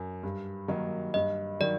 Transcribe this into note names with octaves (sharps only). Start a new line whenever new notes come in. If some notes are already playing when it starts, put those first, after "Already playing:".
Already playing: F#2
G2
D#3 F#3 A#3 D#4
G2 D#5
D#3 F#3 D5